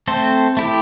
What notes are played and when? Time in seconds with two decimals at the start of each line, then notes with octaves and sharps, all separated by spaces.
0.07 A3 C4 A4 C5
0.57 A3 E4 G4